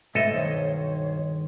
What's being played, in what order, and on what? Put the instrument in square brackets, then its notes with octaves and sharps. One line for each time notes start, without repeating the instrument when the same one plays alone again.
[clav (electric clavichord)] B1 A4 D#5 [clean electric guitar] G#2 A3 [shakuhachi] E5
[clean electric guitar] G2 D#3 C5 [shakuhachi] C#5